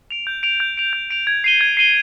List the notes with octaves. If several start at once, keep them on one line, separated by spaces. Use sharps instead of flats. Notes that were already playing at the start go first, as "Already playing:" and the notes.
D7 F7
G6
D7 F7
G6
D7 F7
G6
D7 F7
G#6
C7 D#7 G7
G#6
C7 D#7 G7